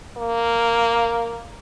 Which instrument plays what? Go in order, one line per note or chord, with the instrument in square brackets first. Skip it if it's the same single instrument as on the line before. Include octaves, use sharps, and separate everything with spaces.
[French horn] A#3